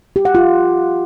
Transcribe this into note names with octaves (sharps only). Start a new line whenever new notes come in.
G4
F#5
F4